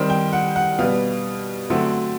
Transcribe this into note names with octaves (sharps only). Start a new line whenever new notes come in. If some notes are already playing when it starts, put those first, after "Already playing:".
Already playing: D#3 G3 C4
G5
F#5
F#5
B2 G3 B3 F5
D3 F#3 A3 C4